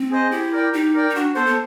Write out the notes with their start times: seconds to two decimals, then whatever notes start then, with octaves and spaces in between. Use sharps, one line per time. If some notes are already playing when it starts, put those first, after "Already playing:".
Already playing: C4
0.10 G#4 C5 D#5
0.31 E4 G4
0.52 A#4 D5 G5
0.73 D#4 G4
0.94 A#4 D5 G5
1.10 D#4
1.15 D4 F#4
1.35 B3 A4 C5
1.46 B3